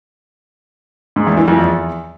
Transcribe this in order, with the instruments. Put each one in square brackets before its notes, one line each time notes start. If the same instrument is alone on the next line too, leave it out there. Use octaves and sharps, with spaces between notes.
[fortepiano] G#2
E2
E3
F2
E2